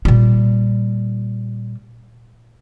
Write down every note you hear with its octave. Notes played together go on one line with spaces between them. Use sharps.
A#2 G3